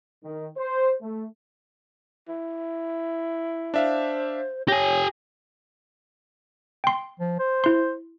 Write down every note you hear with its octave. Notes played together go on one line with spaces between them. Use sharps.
D#3
C5
A3
E4
D4 C5 E5 F5
G4 C#5 G#5 A#6
G5 C6
F3
C5
E4 C6